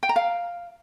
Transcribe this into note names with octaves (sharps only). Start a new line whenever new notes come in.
G5
A#5
F5